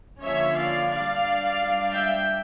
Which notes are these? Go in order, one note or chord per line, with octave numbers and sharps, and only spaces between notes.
D3 F3 A#3 C#4 C#5 E5
D5 F5
G3 D4 D5 F5
G3 D4
E5 G5